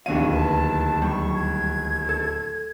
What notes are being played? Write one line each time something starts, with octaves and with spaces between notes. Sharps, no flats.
D1 D#2 D4 F#4 C#5 F5 D#7
B4 A5
F#3 G3 C#6
G#6
A4